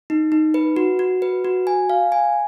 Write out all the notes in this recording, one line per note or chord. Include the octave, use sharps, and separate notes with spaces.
D#4
D#4
B4
F#4
F#4
B4
F#4
G#5
F5
G#5